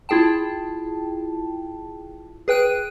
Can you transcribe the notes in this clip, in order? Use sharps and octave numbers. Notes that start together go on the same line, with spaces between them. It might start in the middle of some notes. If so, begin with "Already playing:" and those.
E4 F4 G#4 G5 A5
G#4 B4 G5 F#6 D7 D#7